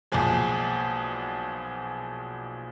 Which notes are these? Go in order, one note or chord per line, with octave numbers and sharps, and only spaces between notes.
B1 A#2 F3 G#3 G#4